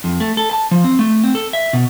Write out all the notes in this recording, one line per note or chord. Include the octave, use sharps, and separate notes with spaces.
F2
A3
A4
A5
F3
C4
A3
C4
A4
E5
B2